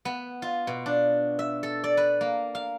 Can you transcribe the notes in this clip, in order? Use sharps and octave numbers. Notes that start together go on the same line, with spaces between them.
B3
F4
B2
D4
E5
A4
D5
B4
A#3
F5